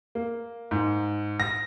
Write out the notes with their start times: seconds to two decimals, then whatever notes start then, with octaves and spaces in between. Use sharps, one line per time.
0.15 A#3
0.71 G#2
1.40 A#6